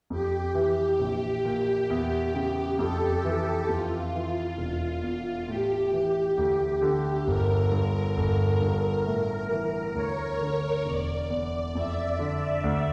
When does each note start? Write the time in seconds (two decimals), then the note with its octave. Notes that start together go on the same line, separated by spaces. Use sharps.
0.10 F2 G4
0.55 E3
1.00 A#1
1.45 A#2
1.90 E2
2.35 C#3
2.79 F2 A4
3.25 E3
3.68 F2 F4
4.14 E3
4.58 E1
5.03 E2
5.47 A2 G4
5.93 E3
6.38 D2
6.82 D3
7.27 G1 A#4
7.72 G2
8.17 G1
8.61 G2
9.06 A2
9.51 E3
9.95 D2 C#5
10.41 D3
10.85 E1 D5
11.30 E2
11.75 F2 E5
12.19 D3 D5
12.64 D2